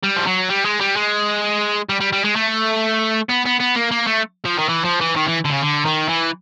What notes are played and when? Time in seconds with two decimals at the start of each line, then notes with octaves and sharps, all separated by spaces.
0.03 G3
0.16 F3
0.27 F#3
0.50 G3
0.65 G#3
0.81 G3
0.96 G#3
1.89 G3
2.01 G3
2.13 G3
2.25 G#3
2.36 A3
3.29 B3
3.45 B3
3.60 B3
3.76 A#3
3.91 A#3
4.07 A3
4.45 F3
4.59 D#3
4.69 E3
4.84 F3
5.00 E3
5.16 D#3
5.27 E3
5.45 D3
5.50 C#3
5.62 D3
5.85 D#3
6.09 E3